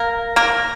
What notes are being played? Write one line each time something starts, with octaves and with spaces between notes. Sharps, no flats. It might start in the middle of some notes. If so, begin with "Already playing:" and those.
Already playing: A#3 A#4
A#3 A#4